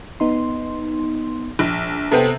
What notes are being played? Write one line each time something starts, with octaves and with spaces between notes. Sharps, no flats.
B3 D#4 C6
A#1
C3 B3 C4 A4